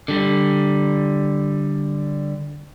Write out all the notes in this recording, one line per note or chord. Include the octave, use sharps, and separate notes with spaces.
D3 G3